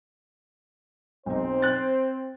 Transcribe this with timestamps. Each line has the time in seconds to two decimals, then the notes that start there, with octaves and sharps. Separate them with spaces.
1.26 B1 C4 D#4 C5
1.62 F#6 A6